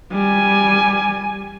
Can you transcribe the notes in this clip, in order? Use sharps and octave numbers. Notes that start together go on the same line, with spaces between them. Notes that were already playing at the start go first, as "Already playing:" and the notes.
G3 G#5